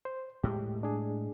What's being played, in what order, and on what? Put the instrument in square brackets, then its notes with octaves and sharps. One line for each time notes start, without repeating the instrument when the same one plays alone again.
[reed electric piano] C5
[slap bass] A2 G#3 [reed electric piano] G4
[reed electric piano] D4 G#4